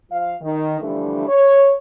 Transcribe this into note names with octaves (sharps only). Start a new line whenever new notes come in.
F3 F5
D#3
D3 E3 F3 G3 A3 D4
C#5